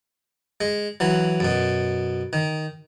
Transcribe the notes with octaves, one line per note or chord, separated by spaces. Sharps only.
G#3
E3 F#3
F#2 B2
D#3